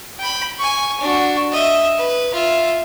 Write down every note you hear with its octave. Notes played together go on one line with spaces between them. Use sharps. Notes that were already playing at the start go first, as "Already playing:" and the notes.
G5 B5
G#5 C#6
D4 F#4
D#5 E5
B4
F4 E5